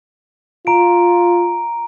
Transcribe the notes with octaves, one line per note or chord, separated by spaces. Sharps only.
F4 A#5 D7